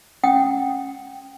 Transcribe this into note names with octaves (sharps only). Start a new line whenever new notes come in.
C#4 F#5 G5 D#6